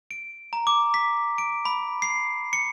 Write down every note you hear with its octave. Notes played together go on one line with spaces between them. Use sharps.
D7
A#5
D6
B6
D7
B5
C7
C#7